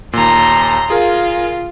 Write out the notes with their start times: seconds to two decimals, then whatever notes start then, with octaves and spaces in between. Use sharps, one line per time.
0.13 D#2 A#2 A#5 C6
0.90 F4 G#4 A#4